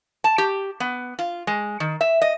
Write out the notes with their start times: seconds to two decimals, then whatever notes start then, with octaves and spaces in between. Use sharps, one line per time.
0.24 A5
0.38 G4
0.80 B3
1.19 F4
1.47 G#3
1.80 D#3
2.01 E5
2.22 D#5